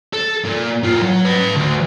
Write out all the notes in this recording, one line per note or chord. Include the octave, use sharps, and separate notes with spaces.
A4
A#2
A2 F4
F#3
B4 A5
D2